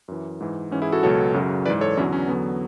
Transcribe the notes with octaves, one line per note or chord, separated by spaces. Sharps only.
F#2 E3
G#2 E3
G#2 E3 C#4
E4 G#4
F#4 A4
C#2 B2 F#3 A4 C#5
F#2 C#3 F#3
G#2 E3 B4 D5
A4 C#5
E2 D3 F#3 C#4 E4
C#4
E2 D3 F#3 B3